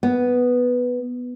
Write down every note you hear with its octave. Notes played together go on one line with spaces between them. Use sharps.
B3